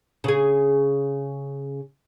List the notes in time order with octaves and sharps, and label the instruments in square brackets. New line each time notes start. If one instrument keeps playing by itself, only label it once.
[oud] C#3 G#4